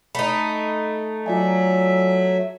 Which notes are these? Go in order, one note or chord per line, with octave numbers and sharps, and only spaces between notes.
A3 D#4 B5
F#3 F4 D5 E5 G#5